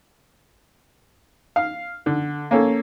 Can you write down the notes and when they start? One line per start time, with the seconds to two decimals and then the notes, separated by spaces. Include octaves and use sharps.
1.56 F5
2.06 D3
2.51 A#3 C#4 A4